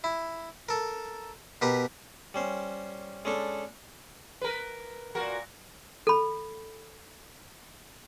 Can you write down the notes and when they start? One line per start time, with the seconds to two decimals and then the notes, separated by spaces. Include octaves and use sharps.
0.04 E4
0.69 A4 A#4
1.62 B2 G4 A#4 B4 A#5
2.34 G3 C#4 C5
3.25 G#3 C#4 D4 A4
4.41 A#4 B4
5.15 A#2 F#4 A#4
6.07 A4 B5